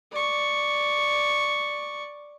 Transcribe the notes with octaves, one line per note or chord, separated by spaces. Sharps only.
D5 C#6